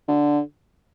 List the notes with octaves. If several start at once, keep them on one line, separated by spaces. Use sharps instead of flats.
D3